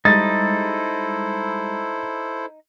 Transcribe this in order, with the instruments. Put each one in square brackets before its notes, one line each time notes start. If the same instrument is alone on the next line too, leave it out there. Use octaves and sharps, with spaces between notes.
[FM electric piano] G3 G#3 [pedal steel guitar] D#4 [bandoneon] E4 A4 C5 [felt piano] A6